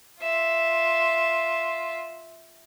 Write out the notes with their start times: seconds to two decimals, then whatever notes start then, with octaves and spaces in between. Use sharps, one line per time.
0.20 F4 E5